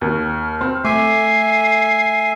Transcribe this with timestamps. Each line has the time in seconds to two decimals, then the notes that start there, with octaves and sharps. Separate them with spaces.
0.02 D#2 F6
0.61 C4
0.85 A3 E5 G#5 D6 C7